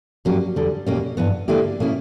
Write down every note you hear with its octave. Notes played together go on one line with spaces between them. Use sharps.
G2 F#3 A#3 C#4 G4
E2 D3 G3
E2 B2 A#3 C#4 G4
G2 E3 B3
D3 A#3 E4 G4
B2 A#3 C#4 E4